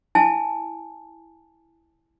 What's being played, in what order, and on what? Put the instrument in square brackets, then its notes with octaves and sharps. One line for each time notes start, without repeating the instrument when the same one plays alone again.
[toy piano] E4 G#5 A5